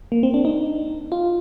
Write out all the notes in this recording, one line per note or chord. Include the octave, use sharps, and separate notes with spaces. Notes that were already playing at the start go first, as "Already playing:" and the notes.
A#3
C4
D4
D#4
F4